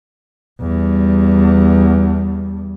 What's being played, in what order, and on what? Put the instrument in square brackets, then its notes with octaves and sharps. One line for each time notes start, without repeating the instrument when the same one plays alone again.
[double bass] E2 G3